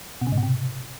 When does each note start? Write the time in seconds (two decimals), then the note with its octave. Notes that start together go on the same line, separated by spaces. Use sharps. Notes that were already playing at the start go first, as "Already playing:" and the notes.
0.21 B2
0.27 C#3
0.32 G#2
0.38 B2
0.43 C3